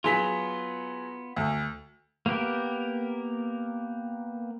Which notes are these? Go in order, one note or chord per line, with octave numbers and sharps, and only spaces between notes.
F#3 B3 F4 G#4 B6
D2
A#3 B3 G4 A#4